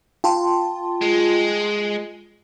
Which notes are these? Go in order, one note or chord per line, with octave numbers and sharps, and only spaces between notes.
F4 G5 A5 C6
G#3